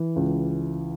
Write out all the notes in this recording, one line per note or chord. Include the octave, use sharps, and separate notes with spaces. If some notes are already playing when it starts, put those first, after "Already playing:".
Already playing: E3
C#2